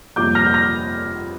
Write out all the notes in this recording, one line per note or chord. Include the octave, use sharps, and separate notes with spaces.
F2 C3 G3 A#3 D6 G6
F6 A#6
G6
F6 A#6